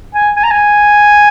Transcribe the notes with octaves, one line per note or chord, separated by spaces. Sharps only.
G#5
G#5
A#5
G#5